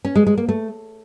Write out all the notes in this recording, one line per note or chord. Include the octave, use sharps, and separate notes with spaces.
C#4
G#3
G#3
A#3
A3